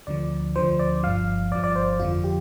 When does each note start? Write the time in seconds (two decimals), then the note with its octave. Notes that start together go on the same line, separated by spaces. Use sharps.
0.07 D2 D3 F3 D5
0.56 D2 D3 F3 C5
0.80 D5
1.03 G1 G2 F3 F5
1.52 G1 G2 F3 D5
1.64 D5
1.76 C5
2.00 F2 D3 F3 F4
2.24 G4